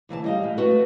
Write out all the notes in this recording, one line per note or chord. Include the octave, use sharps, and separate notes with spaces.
D2 E3 G#5 A5
G3 D#5 F5
A2
A3 F#4 B4